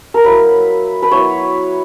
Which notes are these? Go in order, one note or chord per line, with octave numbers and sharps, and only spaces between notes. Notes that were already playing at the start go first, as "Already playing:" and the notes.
A#4
F#3 A#3 E4 B4
B4
F#3 B3 E4 C#5